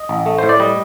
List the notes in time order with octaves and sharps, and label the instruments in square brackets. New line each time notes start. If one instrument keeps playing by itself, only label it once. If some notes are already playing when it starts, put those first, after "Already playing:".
Already playing: [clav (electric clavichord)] D#5
A1
A3
A2 C5
D5
G3 D#5